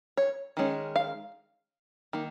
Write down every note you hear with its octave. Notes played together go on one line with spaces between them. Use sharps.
C#5
D#3 G#3 C#4
F5
D#3 A#3